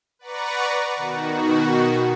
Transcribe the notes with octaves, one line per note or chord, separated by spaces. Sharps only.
B4 D5 F#5 A#5 C#6
B2 D#3 F#4